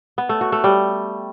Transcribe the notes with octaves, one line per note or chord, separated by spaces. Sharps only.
B3
A3
F#4
A3
G3